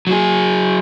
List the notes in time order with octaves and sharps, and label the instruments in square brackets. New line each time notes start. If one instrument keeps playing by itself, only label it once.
[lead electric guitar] F#3 G#4